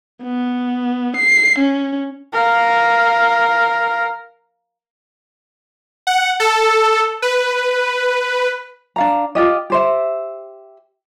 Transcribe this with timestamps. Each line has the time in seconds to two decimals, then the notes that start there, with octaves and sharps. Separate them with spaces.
0.23 B3
1.16 C7
1.59 C#4
2.33 A#4 F5
6.07 F#5
6.40 A4
7.22 B4
8.96 D4 F5 A#5
9.35 F4 G4 D#5
9.70 G4 C5 E5